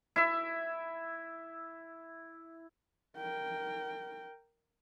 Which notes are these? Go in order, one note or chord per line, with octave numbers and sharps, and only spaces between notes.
E4 E5
A#4 G5